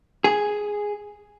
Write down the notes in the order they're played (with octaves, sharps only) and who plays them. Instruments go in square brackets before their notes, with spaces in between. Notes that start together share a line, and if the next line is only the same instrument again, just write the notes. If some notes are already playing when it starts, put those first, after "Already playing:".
[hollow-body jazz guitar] G#4